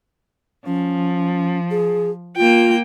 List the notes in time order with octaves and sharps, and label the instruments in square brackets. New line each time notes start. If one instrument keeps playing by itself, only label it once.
[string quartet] F3 [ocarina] C#4
[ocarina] G#4
[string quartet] A#3 G5 [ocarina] F4